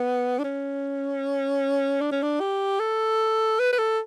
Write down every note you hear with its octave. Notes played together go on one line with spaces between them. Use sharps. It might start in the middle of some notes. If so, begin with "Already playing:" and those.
Already playing: B3
D4
C#4
D4
C#4
D4
G4
A4
B4
B4
A4